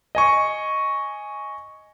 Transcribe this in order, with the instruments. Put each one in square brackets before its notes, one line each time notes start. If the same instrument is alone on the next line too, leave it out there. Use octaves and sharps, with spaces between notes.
[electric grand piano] D#5 G#5 C#6